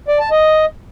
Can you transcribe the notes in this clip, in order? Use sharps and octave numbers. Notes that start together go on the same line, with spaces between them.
D5
A5
D#5